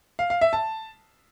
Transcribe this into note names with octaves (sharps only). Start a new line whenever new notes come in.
F5
F5
E5
A5